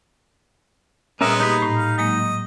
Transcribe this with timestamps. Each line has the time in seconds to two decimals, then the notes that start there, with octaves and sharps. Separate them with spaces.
1.21 A#2 G3 G#3 B3 C#4 A#4 E5
1.40 A#3 D#4 G4 B5
1.60 A2 A#5
1.77 F5
1.98 F#3 G#3 A#3 D#5